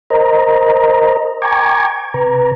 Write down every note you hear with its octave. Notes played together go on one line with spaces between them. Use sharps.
A#4 C5 D#5 A#5
G5 G#5 A#5 C#6 D6 G#6
C3 B4 A#5